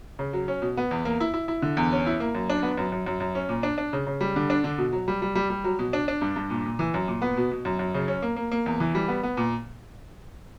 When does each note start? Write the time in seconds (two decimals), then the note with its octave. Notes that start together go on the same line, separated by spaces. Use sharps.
0.19 C#3
0.33 F#3
0.48 C#4
0.62 B2
0.77 B3
0.91 E2
1.05 A#3
1.20 E4
1.34 E4
1.48 E4
1.62 D3
1.77 E2
1.92 C#4
2.07 E4
2.20 A#3
2.35 F#2
2.50 D4
2.63 B3
2.78 F#2
2.92 F#2
3.06 F#2
3.20 F#2
3.35 C#4
3.49 A#2
3.63 D4
3.78 D4
3.93 C#3
4.07 C#3
4.21 G3
4.36 D3
4.50 D4
4.64 D3
4.78 B2
4.92 F#3
5.08 G3
5.22 G3
5.35 G3
5.50 G3
5.64 F#3
5.79 B2
5.93 D4
6.08 D4
6.21 G2
6.36 G2
6.50 A#2
6.65 A#2
6.79 E3
6.94 F#2
7.08 A#2
7.22 B3
7.37 B2
7.52 B2
7.65 F#2
7.79 F#2
7.94 C#3
8.08 C#4
8.22 A#3
8.36 A#3
8.51 A#3
8.66 E2
8.80 E3
8.95 G3
9.08 B3
9.23 B3
9.37 A#2